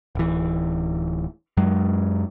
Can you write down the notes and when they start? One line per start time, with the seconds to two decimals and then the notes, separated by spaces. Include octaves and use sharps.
0.15 D1 E3
1.57 F#2 F#3 G#3